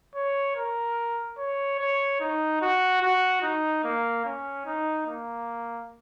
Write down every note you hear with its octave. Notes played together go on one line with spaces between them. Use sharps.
C#5
A#4
C#5
C#5
D#4
F#4
F#4
D#4
A#3
C#4
D#4
A#3